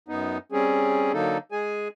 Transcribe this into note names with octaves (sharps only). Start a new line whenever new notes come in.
F#2 B3 D#4
G3 C4 C#4 G#4
D3 F#3 A#3 D#4 A4
G#3 G#4 G#5